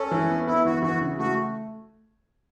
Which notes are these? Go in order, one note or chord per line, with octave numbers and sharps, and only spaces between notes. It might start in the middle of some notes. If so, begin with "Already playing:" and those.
Already playing: C#4 A4
E3
B3
B3 E4
E3 F#4
E3 F#4
C#3
A3 F#4